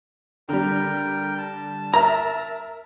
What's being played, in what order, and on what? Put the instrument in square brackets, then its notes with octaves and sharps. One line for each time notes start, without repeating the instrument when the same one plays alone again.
[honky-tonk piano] D3 G3 [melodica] A#4 G5
[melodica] A5
[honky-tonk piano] A#4 E5 [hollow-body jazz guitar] A#5